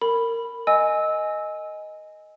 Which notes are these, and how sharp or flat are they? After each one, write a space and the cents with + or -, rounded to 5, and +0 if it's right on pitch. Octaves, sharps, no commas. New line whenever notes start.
A#4 -15 B5 +0
D#5 +0 G#5 +0 E6 -15